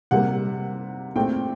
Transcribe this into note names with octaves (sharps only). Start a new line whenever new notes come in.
C3 G3 A#3 F#5
A#2 A3 C4 G5